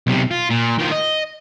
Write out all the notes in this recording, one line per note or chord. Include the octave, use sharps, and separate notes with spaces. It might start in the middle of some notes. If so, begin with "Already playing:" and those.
B1 C3
F4
A#2
D#3 F3
D#5